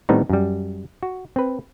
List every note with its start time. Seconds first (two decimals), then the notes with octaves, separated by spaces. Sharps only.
0.09 A2 D#3 G3 B3 C4 D#4
0.29 F#2 G3
1.03 F#4
1.36 C4 B4